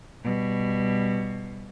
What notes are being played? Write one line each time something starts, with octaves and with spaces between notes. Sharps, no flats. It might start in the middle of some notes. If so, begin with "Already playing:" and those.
B2 G3